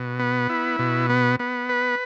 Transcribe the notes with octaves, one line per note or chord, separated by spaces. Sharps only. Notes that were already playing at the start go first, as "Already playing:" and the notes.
Already playing: B2
B3
E4
B2
B3
B3
B4